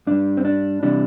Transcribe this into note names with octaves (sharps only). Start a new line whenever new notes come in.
G2 G3 D4
C4
D4
C3 E3 G3 D4